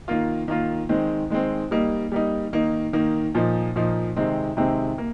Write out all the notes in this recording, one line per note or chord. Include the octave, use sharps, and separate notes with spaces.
D#3 A#3 F4
D#3 A#3 F4
D#3 G#3 C4
D#3 G#3 C4
G3 A#3 D#4
G3 A#3 D#4
D#3 A#3 D#4
D#3 A#3 D#4
A#2 F3 A#3 D#4
A#2 F3 A#3 D#4
C3 D#3 G#3 C4
C3 D#3 G#3 C4
A#3